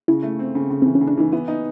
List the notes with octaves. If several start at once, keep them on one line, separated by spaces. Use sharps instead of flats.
C#3 E4
A3
C4
C#3
C#3
E3 C4
C#4
C#3
D4
E3 D#4
B3 E4
D#4